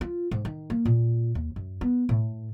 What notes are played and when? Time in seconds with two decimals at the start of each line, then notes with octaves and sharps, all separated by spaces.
0.01 F4
0.31 G#2
0.45 D#3
0.70 A#3
0.85 A#2
1.35 D#2
1.56 F#2
1.81 B3
2.09 A2